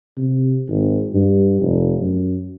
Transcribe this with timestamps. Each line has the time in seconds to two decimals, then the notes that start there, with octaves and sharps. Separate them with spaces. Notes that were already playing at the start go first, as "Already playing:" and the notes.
0.17 C3
0.68 G#1
1.14 G2
1.61 F1
2.00 F#2